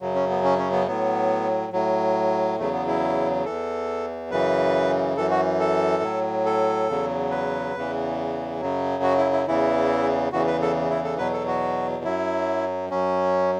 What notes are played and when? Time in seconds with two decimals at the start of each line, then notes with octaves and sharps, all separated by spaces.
0.01 F#2 C#3 F#3
0.15 C#4
0.30 B3
0.44 C#4
0.58 C#4
0.72 B3
0.87 A2 F#3 B3
1.73 A2 F#3
2.59 E2 C#3 F#3 A3
2.73 B3
2.87 E4
3.45 E2 E3 A4
4.31 F#2 C#3 E3 B4
5.17 F#2 E3 A4
5.31 F#4
5.60 A4
6.03 A2 F#3
6.45 A4
6.89 E2 C#3 F#3
7.31 B4
7.75 E2 C#3 E3
8.60 F#2 C#3 F#3
9.03 F#4
9.18 E4
9.32 E4
9.47 E2 C#3 E3 E4
10.32 E2 C#3 E3 F#4
10.47 B4
10.62 A4
10.90 E4
11.04 A4
11.18 E2 B2 F#3 B4
11.33 A4
11.47 F#4
12.04 F#2 F#3 E4
12.90 F#2 F#3 C#4